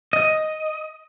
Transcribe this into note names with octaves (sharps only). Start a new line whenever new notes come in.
D#5